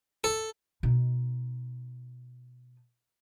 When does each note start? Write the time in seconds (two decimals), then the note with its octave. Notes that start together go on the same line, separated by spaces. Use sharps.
0.24 A4
0.83 B2 D#4